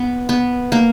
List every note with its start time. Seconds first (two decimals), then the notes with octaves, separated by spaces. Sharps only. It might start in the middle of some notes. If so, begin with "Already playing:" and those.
Already playing: B3
0.29 B3
0.72 A#3